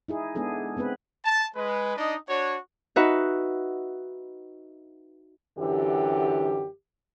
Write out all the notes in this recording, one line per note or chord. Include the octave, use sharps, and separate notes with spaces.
D#4 E4 G#4
G#3 B3 D4 G#4 A4
G#3 B3 C4 B4
A5
G#3 B4
D4 D#4 D#5
D4 F#4 C#5
D#4 F#4 B4 E5
F#2 D3 E3 G4